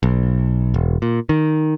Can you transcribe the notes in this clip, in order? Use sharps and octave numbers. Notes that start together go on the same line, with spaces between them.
B1
E1
A#2
D#3